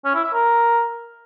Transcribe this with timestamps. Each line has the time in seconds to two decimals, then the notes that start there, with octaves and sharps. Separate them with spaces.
0.05 C#4
0.14 E4
0.24 E5
0.33 A#4